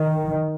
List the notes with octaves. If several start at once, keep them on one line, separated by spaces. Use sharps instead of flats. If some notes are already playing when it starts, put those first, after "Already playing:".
Already playing: D#3